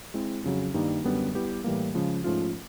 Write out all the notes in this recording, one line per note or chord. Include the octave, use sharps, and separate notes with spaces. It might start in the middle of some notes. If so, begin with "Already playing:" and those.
G#3 C4 E4
F2 C#3 F#3
G2 D#3 G3 A#3 D#4
F#2 D3 G3 B3
G3 B3 E4 G4 B4
A2 E3 G3 A#3
C#3 F3 G#3
G#2 F3 A3 C#4 F4